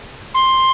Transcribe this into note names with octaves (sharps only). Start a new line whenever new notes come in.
C6